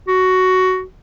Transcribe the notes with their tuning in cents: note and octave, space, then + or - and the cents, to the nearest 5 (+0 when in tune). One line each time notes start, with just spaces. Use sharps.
F#4 +10